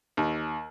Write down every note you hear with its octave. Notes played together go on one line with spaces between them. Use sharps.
D#2